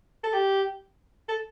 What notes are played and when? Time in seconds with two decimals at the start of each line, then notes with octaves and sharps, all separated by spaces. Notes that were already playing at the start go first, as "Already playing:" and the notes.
0.24 A4
0.33 G4
1.29 A4